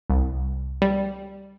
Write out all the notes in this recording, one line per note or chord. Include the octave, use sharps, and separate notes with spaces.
C2
G3